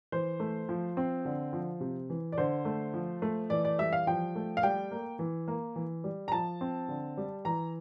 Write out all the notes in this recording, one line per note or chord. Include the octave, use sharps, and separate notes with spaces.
E3 C5
A3
F3
C4
D3
F3
C3
E3
D5
D3 C5
A3
F3
A3
E3 D5
D5
G3 E5
F5
F3 G5
A3
F5
G3 G5
A#3
E3
A#3
E3
G3
A#5
F3 A5
C4
D3
G3
E3 A#5